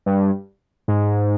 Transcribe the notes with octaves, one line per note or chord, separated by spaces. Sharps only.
G2
G#2